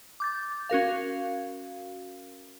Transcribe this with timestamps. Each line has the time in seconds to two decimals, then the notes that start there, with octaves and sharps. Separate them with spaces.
0.20 D6 G6 A6
0.70 C#4 F#4 A#4 F5